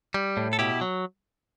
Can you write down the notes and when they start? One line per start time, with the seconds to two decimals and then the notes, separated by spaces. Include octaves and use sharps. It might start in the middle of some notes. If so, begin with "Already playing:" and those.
0.14 G3
0.37 A2
0.53 A4
0.59 B2 E4 G4
0.81 F#3